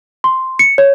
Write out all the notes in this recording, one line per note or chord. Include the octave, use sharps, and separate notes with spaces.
C6
C#7
C#5